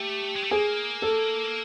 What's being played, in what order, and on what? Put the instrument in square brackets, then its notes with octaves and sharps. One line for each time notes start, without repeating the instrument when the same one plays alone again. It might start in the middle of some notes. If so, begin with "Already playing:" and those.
Already playing: [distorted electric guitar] A3 [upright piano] G4
[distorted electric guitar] G#3
A3
[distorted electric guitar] A#3 [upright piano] G#4
[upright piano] A4